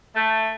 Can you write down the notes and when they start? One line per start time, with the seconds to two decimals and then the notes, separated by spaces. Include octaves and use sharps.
0.16 A3